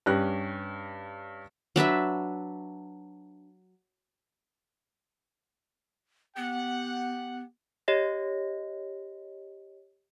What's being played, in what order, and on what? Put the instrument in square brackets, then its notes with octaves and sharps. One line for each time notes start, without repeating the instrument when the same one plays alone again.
[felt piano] G2 C#4 G4 F#6 A#6
[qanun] F#3 D4 B4 E5
[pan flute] B3 [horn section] G4 F#5
[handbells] G4 C#5 D#5 A#6